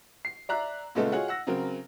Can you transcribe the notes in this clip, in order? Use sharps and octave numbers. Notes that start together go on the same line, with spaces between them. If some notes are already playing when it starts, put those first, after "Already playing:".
C7
D5 E5 A#5 F#6
A#2 C#3 G#3 A3 B3 A4
F4 F#4 G#4 C#5 D#5 F#5
F#5 E6 A#6
C#3 F#3 C4 A#4